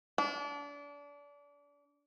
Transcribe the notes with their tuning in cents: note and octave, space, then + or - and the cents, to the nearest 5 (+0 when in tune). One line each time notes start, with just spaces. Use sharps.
D4 -30